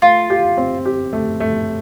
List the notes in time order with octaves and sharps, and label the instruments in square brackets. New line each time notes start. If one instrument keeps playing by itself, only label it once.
[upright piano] A3 [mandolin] F4
[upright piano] G4
C4
G4
A3
A3